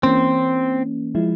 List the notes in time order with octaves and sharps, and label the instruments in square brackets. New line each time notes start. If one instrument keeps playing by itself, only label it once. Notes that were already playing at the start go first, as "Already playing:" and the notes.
[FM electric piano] E3 A#3 C#4 [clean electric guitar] C4
[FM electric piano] F3 G#3 E4